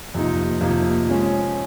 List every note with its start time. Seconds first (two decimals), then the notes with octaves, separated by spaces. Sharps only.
0.14 F2 C3 F3 A#3 D#4
0.61 F2 C3 F3 A#3 D#4
1.08 F3 G#3 C#4